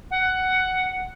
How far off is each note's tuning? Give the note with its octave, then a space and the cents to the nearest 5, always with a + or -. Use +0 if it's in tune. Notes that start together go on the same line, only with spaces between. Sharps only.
F#5 +10